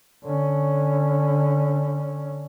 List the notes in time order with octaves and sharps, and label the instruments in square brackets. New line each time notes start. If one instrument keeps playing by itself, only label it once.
[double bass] D3 C#4